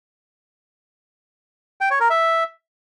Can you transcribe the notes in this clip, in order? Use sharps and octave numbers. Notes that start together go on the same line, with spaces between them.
G5
C#5
A#4
E5